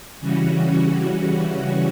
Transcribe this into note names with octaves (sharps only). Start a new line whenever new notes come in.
C#3 E3 G3 C#4 F#4